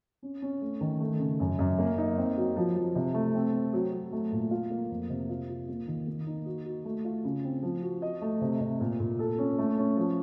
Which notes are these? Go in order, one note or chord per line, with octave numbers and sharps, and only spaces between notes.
C#4
C#4
A3
D#3
A3
C#3
F#2
F#2
A#3
D#4
C4
F#3
F3
F3
C3
A3
C4
C4
F#3
F#3
A3
A#2
F4
A#3
F2
C3
F4
F4
A#3
D#3
A#3
D#4
F#4
F#4
A3
F4
C#3
C4
F3
F#4
D#5
A3
C3
C3
A#2
A#2
A4
C#4
A3
C#4
F3